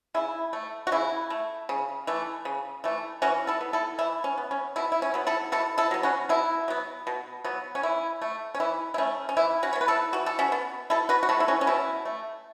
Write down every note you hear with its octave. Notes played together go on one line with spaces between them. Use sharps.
C#3 E4
A3
F#4
C#3 E4
A3
C#3
E3 A3
C#3
E3 A3
E3 C#4 F#4
E4 A4
B3
E4 A4
E3 E4
C#4
B3
C#4
B2 E4
E4
C#4
F#3 B3
E4 A4
B2 E4 A4
E4 A4
F#3 B3
C#4 F#4
B2 E4
F#3 B3
B2
F#3 B3
C#4
E3 E4
A3
C#4
E3 E4
E4
A3 C#4
C#4
E3 E4
C#4 F#4
C#5
B3
B4
E4 A4
E3 F#4
A4
C#4 F#4
B3
B2 E4 A4
F#4 B4
F#4
A3 E4 A4
E4
C#4 F#4
C#4
B2 E4
A3